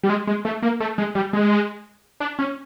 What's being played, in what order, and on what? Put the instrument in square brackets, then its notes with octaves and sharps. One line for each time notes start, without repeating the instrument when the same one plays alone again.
[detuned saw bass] G3
G#3
G#3
A3
A#3
A3
G#3
G3
G#3
D4
C#4